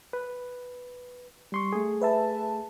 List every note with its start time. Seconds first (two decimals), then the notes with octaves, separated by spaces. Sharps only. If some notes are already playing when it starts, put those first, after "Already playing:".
0.13 B4
1.52 G3 C6 C#6
1.73 A3 G#4
2.01 B4 E5 A5